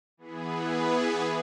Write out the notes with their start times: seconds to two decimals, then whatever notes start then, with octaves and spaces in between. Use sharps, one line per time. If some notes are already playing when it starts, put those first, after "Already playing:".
0.17 E3 B3 G#4 B4